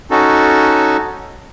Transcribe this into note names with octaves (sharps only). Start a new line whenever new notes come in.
C#4 D#4 F#4 A4